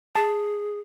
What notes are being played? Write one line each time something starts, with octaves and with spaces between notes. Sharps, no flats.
G#4 A5